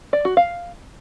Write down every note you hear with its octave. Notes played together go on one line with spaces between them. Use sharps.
D5
F#4
F5